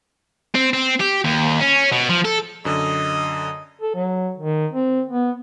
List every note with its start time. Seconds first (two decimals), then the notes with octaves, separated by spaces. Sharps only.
0.55 C4
0.73 C4
1.00 G4
1.24 D#2
1.60 C#4
1.92 B2
2.09 F3
2.25 A4
2.65 F#2 D3 D#5
3.81 A4
3.95 F#3
4.37 D#3
4.73 C4
5.09 B3